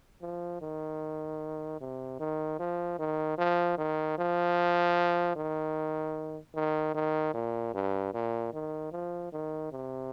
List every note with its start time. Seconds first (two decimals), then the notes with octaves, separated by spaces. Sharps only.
0.22 F3
0.62 D#3
1.81 C3
2.20 D#3
2.60 F3
2.99 D#3
3.38 F3
3.78 D#3
4.18 F3
5.36 D#3
6.55 D#3
6.95 D#3
7.34 A#2
7.74 G2
8.14 A#2
8.53 D#3
8.92 F3
9.32 D#3
9.71 C3